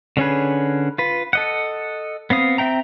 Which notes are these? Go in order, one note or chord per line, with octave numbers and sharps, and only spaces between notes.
D3 C#4 G#4 B4
F4 B4
A4 D#5 F#5
B3 C4 F5 D#6
C4 E5 G5 A#5